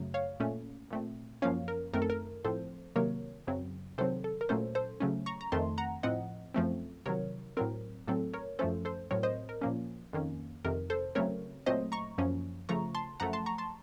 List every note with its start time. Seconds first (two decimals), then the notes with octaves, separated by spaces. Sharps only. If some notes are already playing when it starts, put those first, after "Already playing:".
Already playing: F#2 C#3 F#3 A3
0.14 C#5 F5
0.40 A#2 A3 C#4
0.91 A#2 A3 C4
1.42 F#2 F3 A#3 C#4 C#5 F5
1.68 A#4
1.94 F#2 D#3 A3 C4 A#4
2.02 A4
2.10 A#4
2.44 A2 F3 C4 A4 C5
2.96 C3 D#3 F#3 A#3 A#4 C#5
3.47 F#2 C#3 F#3 C4
3.98 C3 D#3 F#3 C4 A4 C5
4.24 A4
4.41 A#4
4.49 A#2 F#3 A3 C#4 A4 C5
4.75 A4 C5
5.00 C#3 F#3 A3 C#4
5.26 A#5 C#6
5.41 A#5
5.52 F2 D#3 A3 C4 A5 C6
5.78 F#5 A#5
6.03 A2 F3 C4 D#5 F#5
6.54 F#2 F3 A3 C4
7.06 C3 D#3 F#3 A#4 C#5
7.57 A2 F#3 C4 A#4
8.08 A2 F#3 C4 A4
8.33 A#4 C#5
8.59 F#2 F3 A3 C#4 A4 C5
8.85 A4 C5
9.11 A2 F#3 C4 A#4 C#5
9.23 C5 D#5
9.49 A#4
9.61 A#2 F3 A#3 C#4
10.13 F2 D#3 A#3 C#4
10.65 F2 C3 D#3 A#4
10.90 A4 C5
11.15 C#3 F#3 A3 C4 A#4 C#5
11.66 A#2 F#3 A3 C4 C5 D#5
11.92 A#5 C#6
12.18 F#2 F3 A#3 C#4
12.69 C#3 F3 A3 A#5 C#6
12.95 A5 C6
13.20 F#2 F3 A3 F#5 A#5
13.33 A5 C6
13.46 A#5 C#6
13.58 A5 C6